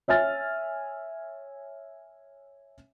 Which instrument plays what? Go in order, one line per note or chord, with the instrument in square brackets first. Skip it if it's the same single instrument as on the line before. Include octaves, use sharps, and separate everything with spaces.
[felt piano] C#5 E5 G#5 F6 A6